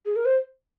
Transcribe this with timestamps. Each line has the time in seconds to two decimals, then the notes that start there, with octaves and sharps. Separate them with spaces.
0.06 G#4
0.16 A#4
0.25 C5